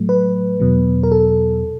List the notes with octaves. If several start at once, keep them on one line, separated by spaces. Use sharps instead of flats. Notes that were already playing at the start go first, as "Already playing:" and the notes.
Already playing: A2 F#3 A3
B4
E2 B2 F#3
A#4
A4